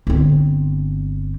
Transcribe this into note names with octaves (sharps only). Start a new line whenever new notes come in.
G1 C4